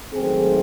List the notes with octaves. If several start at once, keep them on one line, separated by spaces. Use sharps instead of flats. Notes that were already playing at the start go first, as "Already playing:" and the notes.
G#2 D#3 F#3 A3 C4 G#4